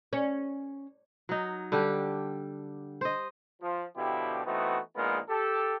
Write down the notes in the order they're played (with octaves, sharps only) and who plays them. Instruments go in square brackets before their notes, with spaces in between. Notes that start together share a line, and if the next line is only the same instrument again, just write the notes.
[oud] C#4
[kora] F#3 D#4
D3 G3 D4 G4
C5 D#5
[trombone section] F3
B2 D3 F3 E4 G4
E3 A3 B3 C4 D#4 F#4
A#1 A#2 G#3 B3 D#4 A#4
G4 A4